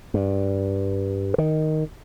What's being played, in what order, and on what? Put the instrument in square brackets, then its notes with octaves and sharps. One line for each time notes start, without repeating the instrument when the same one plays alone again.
[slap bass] G2
D#3